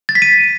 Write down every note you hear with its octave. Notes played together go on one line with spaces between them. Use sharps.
A6
B6
D#7